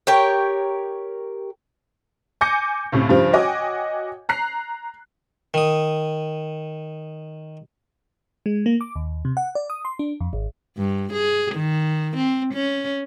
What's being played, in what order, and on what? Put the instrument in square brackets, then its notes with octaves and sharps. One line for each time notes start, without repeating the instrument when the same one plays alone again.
[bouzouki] G4 A#4 C#5 G5
[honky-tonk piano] G#5 D6 G6 A#6 C#7
C#2 A2 C3
G2 C#3 F3 G3
F#4 C#5 D#5 G5 G#5 D6
A#5 F#6 C7
[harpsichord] D#3 D#6
[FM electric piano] G#3
A#3
D6
D#2
C3
F#5
D5
D#6
C6
D4
F2
G#1
[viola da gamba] G2
G#4
D#3
C4
C#4